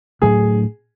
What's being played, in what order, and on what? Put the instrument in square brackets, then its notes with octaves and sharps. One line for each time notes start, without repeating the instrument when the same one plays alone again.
[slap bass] A2 F#3 A3 D4 [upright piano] G#4